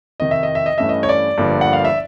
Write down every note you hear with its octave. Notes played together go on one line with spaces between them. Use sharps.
F2 C3 D#3 D#5
E5
D#5
E5
D#5
G2 E3 A3 C#4 E5
D#5
C#5
D5
G1 G2 D3 F3 A#3
F#5
F5
E5